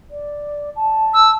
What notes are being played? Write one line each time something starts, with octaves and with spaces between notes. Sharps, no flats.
D5
A5
E6